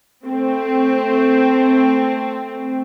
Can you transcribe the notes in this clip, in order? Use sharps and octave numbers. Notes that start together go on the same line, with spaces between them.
A3 C4